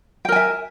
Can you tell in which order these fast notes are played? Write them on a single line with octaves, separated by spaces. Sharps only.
G5 A#4 G#5 E5